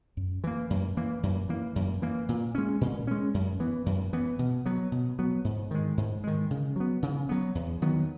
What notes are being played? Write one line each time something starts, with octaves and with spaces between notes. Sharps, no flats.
F#2
E3 A#3
F#2
E3 A#3
F#2
E3 A#3
F#2
E3 A#3
A#2
G#3 C#4
A#2
G#3 C#4
F#2
E3 B3
F#2
E3 B3
B2
F#3 B3
B2
F#3 B3
G#2
D#3 G#3
G#2
D#3 G#3
C#3
F#3 B3
C#3
F#3 B3
E2
D#3 F#3 B3